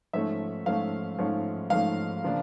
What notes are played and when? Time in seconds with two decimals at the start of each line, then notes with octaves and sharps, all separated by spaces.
0.13 G#2 F3 A3 C#4 E5
0.66 G#2 F3 A3 C#4 F5
1.19 G#2 F3 A3 C#4
1.70 G#2 F3 A3 C#4 F5
2.24 C#3 F3 A#3 D4